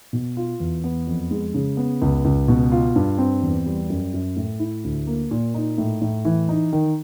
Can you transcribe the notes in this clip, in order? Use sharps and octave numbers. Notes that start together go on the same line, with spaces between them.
B2
F4
E2
B3
F2
G#3
C#3
B3
C#2
C#2
B2
F4
G2
C4
E2
G3
F#2
F#2
A2
E4
D2
A#3
A#2
D#4
A2
A2
E3
D#4
D#3